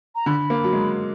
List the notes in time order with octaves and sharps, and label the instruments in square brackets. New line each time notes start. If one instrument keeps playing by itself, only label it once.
[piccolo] A#5
[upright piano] D3 [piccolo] B5
[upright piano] A#3
F#3
G#3